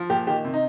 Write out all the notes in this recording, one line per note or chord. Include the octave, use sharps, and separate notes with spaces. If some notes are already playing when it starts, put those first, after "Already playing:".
Already playing: F3
A#2 G4
D#3 G4
C3
D#4